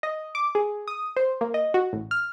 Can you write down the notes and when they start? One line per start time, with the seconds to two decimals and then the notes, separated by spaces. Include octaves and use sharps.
0.03 D#5
0.35 D6
0.55 G#4
0.88 D#6
1.16 C5
1.41 A#3
1.54 D#5
1.74 F#4
1.93 A1
2.11 F6